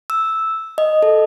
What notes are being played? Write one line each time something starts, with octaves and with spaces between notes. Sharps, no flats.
E6
D#5
A4